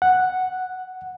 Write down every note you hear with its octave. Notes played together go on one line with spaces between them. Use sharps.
F#5